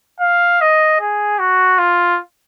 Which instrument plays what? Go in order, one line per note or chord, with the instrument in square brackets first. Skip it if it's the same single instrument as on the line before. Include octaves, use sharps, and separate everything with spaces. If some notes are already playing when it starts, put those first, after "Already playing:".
[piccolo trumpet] F5
D#5
G#4
F#4
F4